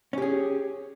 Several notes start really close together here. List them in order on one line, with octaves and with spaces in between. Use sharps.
C#4 G4 G#4